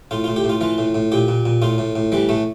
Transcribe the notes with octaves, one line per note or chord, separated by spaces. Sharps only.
A2 F4
A2 F4
G4
A2
F4
E3 F4
A2
A2
A#2 G4
A#2
A#2
A2 F4
A2
A2
E3 G3
A2 A3